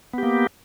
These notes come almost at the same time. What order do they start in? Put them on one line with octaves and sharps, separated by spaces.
B3 G4 A#3